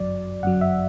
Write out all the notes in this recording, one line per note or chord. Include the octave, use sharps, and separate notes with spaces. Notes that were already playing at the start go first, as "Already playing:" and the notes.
Already playing: G1 F#2 F#3 D5
G1 F#2 F#3 F#5
E5